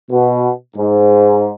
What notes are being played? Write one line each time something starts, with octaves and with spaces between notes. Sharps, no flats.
B2
G#2